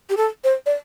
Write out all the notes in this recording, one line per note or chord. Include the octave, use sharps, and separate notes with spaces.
G4
A4
C5
D5